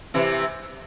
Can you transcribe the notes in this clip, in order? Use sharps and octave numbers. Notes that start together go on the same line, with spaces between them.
C3 E3